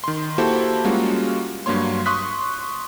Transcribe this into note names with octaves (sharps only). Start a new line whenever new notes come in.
D#3 C6
A#3 E4 F#4 G4 A4 C5
G3 G#3 A#3 C#4 F4 F#4
G2 F#3 A#3 C#5 C6
C6 C#6 D#6 F#6 B6